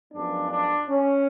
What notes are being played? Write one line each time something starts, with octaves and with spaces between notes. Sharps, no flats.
F#2 F3 G#3 B3 D4
D4
C#4